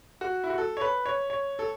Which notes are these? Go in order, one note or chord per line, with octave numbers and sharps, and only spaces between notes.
F#4
E4
F#4
A4
C#5
B4
C#5
C#5
A4